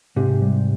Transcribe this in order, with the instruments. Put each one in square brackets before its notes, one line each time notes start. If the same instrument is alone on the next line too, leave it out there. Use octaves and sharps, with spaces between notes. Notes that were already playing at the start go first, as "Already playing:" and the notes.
[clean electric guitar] G#2 C3 [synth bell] G4
[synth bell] G3